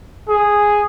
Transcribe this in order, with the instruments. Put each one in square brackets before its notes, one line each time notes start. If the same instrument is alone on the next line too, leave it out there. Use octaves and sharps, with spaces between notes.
[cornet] G#4